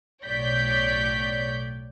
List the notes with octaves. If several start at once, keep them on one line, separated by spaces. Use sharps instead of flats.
B1 A2 C#5 D5 G6 B6